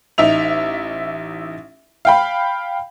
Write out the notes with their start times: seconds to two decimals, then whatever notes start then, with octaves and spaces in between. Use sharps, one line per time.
0.18 A1 D#4 E5 F7
2.05 F5 G5 B5